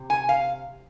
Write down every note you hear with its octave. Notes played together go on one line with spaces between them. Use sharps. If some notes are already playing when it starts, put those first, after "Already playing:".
Already playing: C3
G#5
F5